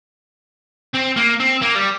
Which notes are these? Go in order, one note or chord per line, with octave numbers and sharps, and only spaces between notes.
C4
A#3
C4
A#3
G3